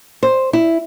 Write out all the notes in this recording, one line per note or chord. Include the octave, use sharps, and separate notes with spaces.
C5
E4